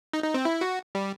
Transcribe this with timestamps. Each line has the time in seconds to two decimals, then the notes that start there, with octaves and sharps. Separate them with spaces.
0.13 D#4
0.24 D#4
0.34 C4
0.45 E4
0.61 F#4
0.95 G3